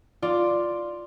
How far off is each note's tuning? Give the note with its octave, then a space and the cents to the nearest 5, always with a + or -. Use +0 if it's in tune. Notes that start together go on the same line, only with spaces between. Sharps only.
F4 +0 D5 +5